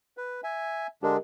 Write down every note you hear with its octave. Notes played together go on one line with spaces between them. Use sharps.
B4
E5 G#5
D3 G#3 D4 G4 A#4 D#5